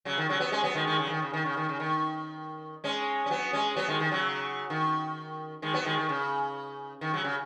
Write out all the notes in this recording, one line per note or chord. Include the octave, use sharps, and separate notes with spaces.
C#3 F#3
D#3
C#3 F#3
F#3 B3
G#3 C#4
F#3 B3
D#3 G#3
D#3 G#3
C#3
F#3
D#3
C#3
D#3
C#3
D#3
C#3
D#3
G#3 C#4
C#4
F#3 B3
G#3 C#4
F#3 B3
D#3 G#3
D#3
C#3 F#3
D#3
D#3 G#3
F#3 B3
D#3 G#3
D#3
C#3
D#3
C#3 F#3
C#3